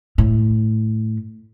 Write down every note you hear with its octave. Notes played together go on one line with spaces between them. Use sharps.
A2